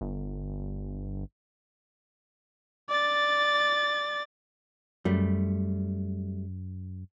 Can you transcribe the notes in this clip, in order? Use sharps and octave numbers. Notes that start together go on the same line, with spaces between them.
G1
D5 A6
F#2 G3 A3